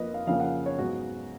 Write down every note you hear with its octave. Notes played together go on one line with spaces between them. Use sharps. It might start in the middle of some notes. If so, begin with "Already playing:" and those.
Already playing: F2 F3 A#3 B4 D#5
F5
F2 C#3 F3 A#3 F5
F#5
C#5
G#2 F#3 B3 F#4